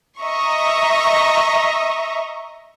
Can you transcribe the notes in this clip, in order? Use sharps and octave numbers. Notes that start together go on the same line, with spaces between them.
D#5 E5 A#5 C#6